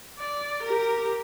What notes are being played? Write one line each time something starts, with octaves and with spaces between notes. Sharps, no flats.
D5
G4 A#4